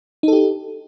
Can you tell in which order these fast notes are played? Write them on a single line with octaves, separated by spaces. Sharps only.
D#4 A4 G4